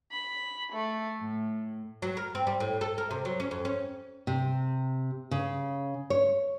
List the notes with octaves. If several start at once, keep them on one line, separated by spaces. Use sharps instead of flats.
B5
A3
A2
F#3
A#4
C4
G3
A2
A4
A#4
C3
F#3
C#4
F2
C#4
C3
C#3
C#5